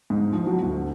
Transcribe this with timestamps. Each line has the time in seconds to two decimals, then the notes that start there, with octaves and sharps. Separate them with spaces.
0.10 G#2
0.33 F3
0.47 F#3
0.63 D2